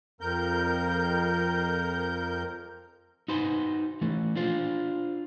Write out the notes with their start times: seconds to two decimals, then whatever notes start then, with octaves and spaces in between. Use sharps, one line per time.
0.21 F2 A#4 G6
3.28 D#4 F#4 B4 C5
4.01 E3 A3
4.36 D4 F4 C5